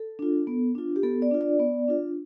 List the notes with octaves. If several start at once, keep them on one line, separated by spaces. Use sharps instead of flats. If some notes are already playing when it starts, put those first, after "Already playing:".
Already playing: A4
D4 F4
B3
D4 F4
G4
B3 A4
D5
D4 F4
D5
B3
D4 F4